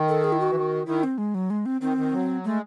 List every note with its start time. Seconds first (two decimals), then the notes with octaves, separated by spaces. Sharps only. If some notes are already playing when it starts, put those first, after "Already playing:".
Already playing: D#3
0.08 A4
0.24 G#4
0.32 E4
0.40 F#4
0.50 E3
0.55 D#3
0.86 D#3 E4
1.03 C4
1.18 G#3
1.34 F#3
1.50 G#3
1.66 C4
1.81 D#3 C4
1.98 D#3
2.12 F#3
2.44 G#3 A3